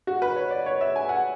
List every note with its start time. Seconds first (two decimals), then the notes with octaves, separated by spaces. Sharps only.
0.07 F#4
0.22 B4
0.36 C#5
0.51 D5
0.66 C#5
0.81 E5
0.96 G#5
1.09 F#5